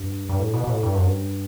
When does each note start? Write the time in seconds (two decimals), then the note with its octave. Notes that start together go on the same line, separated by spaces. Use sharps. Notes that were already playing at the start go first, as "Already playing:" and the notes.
Already playing: G2
0.29 G2
0.39 A2
0.54 B2
0.64 B2
0.69 A2
0.83 G2
0.94 F#2
1.06 G2